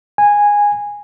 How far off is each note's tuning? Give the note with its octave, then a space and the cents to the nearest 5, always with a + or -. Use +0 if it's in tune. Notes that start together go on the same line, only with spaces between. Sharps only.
G#5 -10